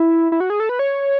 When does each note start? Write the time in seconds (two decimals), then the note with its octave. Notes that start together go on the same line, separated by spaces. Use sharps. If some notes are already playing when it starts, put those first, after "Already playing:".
Already playing: E4
0.32 E4
0.40 F#4
0.50 G#4
0.60 A4
0.69 B4
0.79 C#5